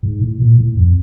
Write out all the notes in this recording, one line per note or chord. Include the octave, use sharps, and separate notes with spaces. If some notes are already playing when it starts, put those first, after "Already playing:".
G#2
A2
A#2
A2
F2